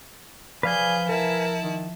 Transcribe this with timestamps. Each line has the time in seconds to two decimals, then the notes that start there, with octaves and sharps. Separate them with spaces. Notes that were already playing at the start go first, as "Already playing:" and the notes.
0.63 F3 G#4 B4 D5 F5 G#5 G6
1.09 F3 E4 A#4 A5
1.63 D#3